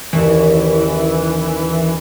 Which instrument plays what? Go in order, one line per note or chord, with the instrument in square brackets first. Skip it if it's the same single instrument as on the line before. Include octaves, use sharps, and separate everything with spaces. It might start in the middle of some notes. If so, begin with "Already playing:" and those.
[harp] F#1 D#2 C#5 [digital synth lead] E3